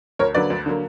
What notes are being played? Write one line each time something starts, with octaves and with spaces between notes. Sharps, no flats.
D2 A#4 C#5
D3 F#3 A#3 B4 D5
D2
D3 F#3 A#3